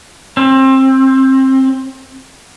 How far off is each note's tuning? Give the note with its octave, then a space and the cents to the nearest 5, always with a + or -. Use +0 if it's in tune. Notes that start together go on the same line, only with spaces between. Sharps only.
C4 +25